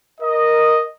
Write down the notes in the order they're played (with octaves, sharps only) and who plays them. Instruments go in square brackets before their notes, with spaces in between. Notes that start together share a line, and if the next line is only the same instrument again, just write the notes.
[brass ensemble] A#4 D#5